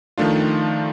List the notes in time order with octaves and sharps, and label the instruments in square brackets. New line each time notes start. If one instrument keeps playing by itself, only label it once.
[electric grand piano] D#3 F3 A3 D4 F4